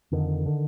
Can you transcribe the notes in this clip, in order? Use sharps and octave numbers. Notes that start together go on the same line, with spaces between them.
F2 D3 D#3
D3